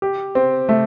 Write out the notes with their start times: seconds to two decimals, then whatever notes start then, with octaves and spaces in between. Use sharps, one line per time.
0.02 G4
0.35 C4
0.69 A3